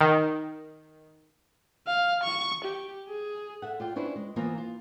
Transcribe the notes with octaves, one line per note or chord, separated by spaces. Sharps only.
D#3
F5
C#6
G4
G#4
A4 E5 F#5
F4 D5 G5
C#4 D4 E4 B4 C5 D5
G#3
E3 A#3 B3 F4 C5 D#5
F4